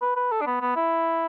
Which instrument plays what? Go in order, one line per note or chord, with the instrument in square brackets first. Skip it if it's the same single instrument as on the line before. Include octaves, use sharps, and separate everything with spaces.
[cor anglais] B4
B4
A4
D4
B3
B3
E4